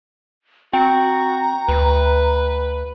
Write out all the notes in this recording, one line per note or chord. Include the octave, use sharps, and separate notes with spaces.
C4 F#4 G5 A#5
D2 B4